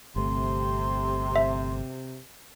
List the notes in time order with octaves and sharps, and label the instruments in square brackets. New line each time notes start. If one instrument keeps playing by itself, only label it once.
[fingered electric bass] G1 A3 [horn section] C3 [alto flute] C6
[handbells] E5